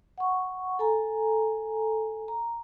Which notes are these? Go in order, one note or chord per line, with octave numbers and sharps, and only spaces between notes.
F#5 C#6
A4 G#5 A#5
A#5